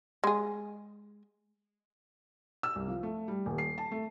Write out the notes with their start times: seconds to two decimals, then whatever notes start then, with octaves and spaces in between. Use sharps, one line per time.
0.24 G#3 G#4
2.63 E6
2.76 C2
2.88 F3
3.03 A3
3.28 G3
3.46 D#1
3.58 C7
3.78 A5
3.91 A3